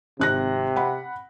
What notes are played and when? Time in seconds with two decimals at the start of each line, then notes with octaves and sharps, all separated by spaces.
0.20 G#1 C3 F#6 A#6
0.76 F#5 B5